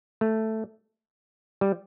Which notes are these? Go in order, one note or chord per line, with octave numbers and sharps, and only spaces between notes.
A3
G3